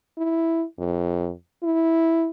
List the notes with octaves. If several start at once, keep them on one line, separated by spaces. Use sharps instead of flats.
E4
F2
E4